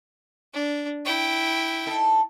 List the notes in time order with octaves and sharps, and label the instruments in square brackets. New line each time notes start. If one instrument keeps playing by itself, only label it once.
[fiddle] D4
E4 G5
[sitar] D#4 A4